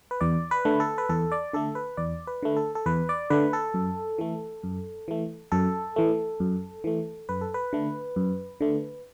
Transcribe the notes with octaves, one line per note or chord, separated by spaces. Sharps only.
B4
E2 D5
B4
D3 A3
A4
B4
E2 A4
D5
D3 A3 A4
B4
E2 D5
B4
D3 A3
A4
A4
E2 B4
D5
D3 A3 B4
A4
F#2
E3 A3
F#2
E3 A3
F#2 A4
E3 A3
F#2
E3 A3
F#2 B4
A4
B4
D3 A3
F#2
D3 A3